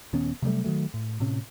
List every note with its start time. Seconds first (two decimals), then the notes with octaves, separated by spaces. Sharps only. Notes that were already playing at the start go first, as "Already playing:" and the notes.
0.13 D#1 D#3 B3 C#4
0.42 C3 F#3 G3 A3
0.64 D#3 E3 F#3 A3
0.94 A2
1.20 A2 C3 C#4